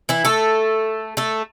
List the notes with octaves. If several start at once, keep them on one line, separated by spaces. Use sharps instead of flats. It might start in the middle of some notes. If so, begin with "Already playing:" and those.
E3 E4
A3 A4
A3 A4